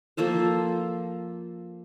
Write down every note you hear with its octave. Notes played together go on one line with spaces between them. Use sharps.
F3 A#3 A4 C5